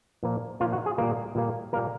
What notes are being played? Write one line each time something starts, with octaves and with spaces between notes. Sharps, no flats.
A#2 F3 A#3
A#2 F3 A#3 F4
F#4
G#4
A#2 G3 A#3
A#2 G3 A#3
A#2 G3 A#3 A#4